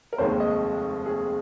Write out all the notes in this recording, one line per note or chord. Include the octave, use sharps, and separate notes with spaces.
A#4
F1 D#2 D#3 G#3 C5
D#5
G#4